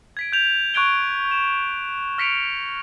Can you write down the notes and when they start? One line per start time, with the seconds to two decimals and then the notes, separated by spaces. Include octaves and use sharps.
0.17 G#6 B6 D7
0.32 G6 F7
0.74 C#6 F#6 G#6 D7 G7
1.31 E7
2.18 F6 A#6 B6 C#7 D7 F7